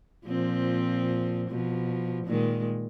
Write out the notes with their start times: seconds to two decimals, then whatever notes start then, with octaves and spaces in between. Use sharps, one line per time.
0.26 A#2 F3 C4
1.49 B2 F3
2.26 A#2 D#3 G#3